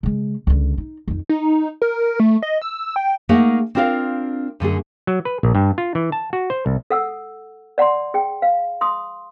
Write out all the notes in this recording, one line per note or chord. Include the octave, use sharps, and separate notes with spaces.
C#3 G#3
C#2 D3
D#4
F2 D#4
D#4
A#4
A3
D#5
E6
G5
A3 A#3 D#4 G#4 A#4 F#5
C4 D4 F4 A#4 E5 F5
F#2 D3 A3 G#4
F#3
B4
A#1
G2
F4
E3
A5
F#4
C5
C2
A4 F#5 E6
D5 F#5 A#5 C6
G#4 G5
F5
C6 D#6